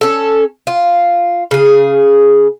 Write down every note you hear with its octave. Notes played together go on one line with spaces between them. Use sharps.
C#4 A4
F4
C#3 G#4